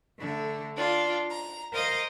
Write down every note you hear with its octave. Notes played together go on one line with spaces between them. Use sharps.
D3 A3
D4 F4
A#5
A#4 C5 D#5 F5